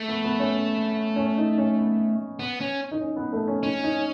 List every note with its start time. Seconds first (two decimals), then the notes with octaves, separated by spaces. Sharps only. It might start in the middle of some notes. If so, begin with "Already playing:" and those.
Already playing: A3
0.08 B3
0.24 B3
0.39 C#4
1.16 C#4
1.38 D#4
1.58 C#4
1.78 B3
2.39 B3
2.61 C#4
2.91 D#4
3.01 C#4
3.16 B3
3.33 A3
3.48 C#4
3.63 C#4 D#4
3.84 D#4